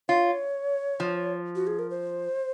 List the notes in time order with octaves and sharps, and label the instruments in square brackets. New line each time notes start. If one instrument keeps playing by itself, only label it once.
[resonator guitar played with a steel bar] F4 [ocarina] C#5
[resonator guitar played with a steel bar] F3
[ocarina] F#4
G#4
A#4
C5